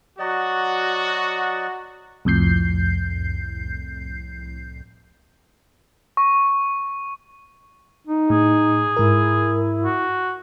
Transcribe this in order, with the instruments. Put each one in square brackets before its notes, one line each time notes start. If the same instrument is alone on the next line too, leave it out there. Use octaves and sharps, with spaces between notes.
[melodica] F#3 D5 D#5 [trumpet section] F#4
[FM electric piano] C2 F2 A2 G6 C7
[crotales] C#6
[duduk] D#4
[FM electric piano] A2 [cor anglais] G#4
[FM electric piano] G#2 A#4 [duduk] E4
[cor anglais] F#4